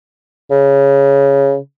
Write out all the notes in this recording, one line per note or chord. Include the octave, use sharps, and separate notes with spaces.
C#3